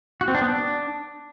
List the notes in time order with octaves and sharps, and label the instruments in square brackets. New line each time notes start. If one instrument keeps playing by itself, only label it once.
[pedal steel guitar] F#4
C4
D4
B3
D4